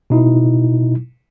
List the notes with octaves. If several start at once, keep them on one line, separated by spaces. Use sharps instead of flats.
B2 D#4 E4